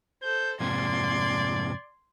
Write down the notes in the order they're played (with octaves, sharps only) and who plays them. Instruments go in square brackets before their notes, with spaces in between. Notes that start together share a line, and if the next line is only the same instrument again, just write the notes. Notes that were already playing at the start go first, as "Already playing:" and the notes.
[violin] A4 C5 [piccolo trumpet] G6
[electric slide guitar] F2 G#2 C3 [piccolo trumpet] D5 [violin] C6 G#6